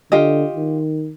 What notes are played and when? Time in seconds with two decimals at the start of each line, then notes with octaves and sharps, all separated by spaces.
0.12 D3 F4 G4 D#5
0.56 D#3